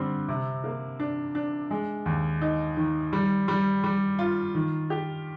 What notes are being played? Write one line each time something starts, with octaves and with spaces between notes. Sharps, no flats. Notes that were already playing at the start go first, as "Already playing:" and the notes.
Already playing: D3 G3 C4
C3
A#3
D4
D4
G#3
D#2
D#4
D#3
G3
G3
G3
F4
D#3
G4